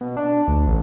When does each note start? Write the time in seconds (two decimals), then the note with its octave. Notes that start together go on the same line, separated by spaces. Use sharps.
0.01 B2
0.17 D4
0.48 D2
0.68 A1